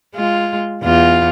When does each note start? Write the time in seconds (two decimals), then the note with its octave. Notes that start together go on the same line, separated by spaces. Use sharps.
0.15 G#3 F4
0.83 E2 F4